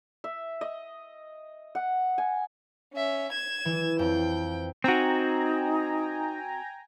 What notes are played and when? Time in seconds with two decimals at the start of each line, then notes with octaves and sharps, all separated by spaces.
0.24 E5
0.61 D#5
1.75 F#5
2.18 G#5
2.93 C#4 E5
3.32 G#6 E7
3.65 E3
3.99 F2 G5
4.84 C4 D#4 F#4 G5 G#5 A#5